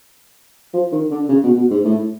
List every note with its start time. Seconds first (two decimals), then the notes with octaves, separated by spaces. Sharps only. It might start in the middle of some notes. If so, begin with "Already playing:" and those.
0.74 F3
0.92 D#3
1.11 D3
1.29 C#3
1.43 B2
1.57 B2
1.71 G#2
1.84 A2